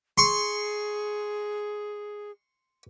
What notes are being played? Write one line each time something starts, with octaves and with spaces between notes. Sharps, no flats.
G#4 C6 C#6